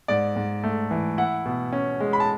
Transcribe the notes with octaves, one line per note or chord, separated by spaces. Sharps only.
G#2 D5
G#2
A3
E3
E4 F#5
B2
C#4
G#3
B5
A5